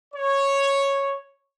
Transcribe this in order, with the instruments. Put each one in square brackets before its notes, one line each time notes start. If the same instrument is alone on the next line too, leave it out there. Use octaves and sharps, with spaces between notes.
[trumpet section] C#5